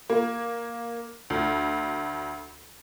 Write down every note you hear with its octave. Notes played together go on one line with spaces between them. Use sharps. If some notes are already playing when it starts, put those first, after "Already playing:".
A#3
D2